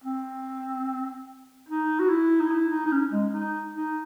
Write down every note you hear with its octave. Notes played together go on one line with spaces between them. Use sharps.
C4
D#4
F#4
E4
D#4
E4
D#4
D#4
C#4
G#3
D#4
D#4